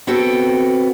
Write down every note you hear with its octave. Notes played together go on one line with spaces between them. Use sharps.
B3 C4 F#4 A4 G5